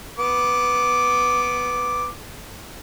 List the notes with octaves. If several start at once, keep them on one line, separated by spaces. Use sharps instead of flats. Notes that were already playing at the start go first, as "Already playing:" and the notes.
B3 D6